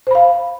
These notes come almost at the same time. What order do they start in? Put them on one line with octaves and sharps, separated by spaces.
C5 B5 F5